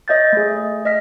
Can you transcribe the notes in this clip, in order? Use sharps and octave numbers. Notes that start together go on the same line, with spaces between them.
C#5 D#5 E5 G6 A6
A3 G#4
D#5 F6 B6